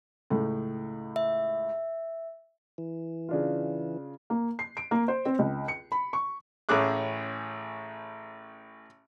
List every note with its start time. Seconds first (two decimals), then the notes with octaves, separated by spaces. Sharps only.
0.30 C#2 A2
1.16 E5
2.78 E3
3.29 C#3 D4 F4
4.30 A#3
4.59 C7
4.77 D7
4.91 A#3
5.08 C5
5.26 C4
5.39 C#2
5.68 C#7
5.92 B5
6.13 C#6
6.69 A1 A2 C#4 G#4 D6 F#6